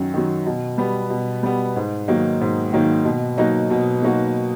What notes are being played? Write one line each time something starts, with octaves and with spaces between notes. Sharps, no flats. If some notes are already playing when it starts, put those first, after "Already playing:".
Already playing: F#2 D#3 F#3
D#3 F#3
B2
G3 B3
B2
G3 B3
G#2
D#3 F#3 A#3 D#4
G#2
D#3 F#3 A#3 D#4
B2
F#3 A#3 D#4 F#4
B2
F#3 A#3 D#4 F#4